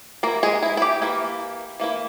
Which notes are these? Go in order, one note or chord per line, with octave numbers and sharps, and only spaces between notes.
E3 A#3 E4 A#4
G#3 G#4
E4
E4
G4
E3 A#3 E4
E3 A#3 E4